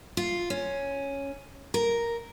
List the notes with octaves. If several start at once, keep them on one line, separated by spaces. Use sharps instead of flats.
F4
C#4
A#4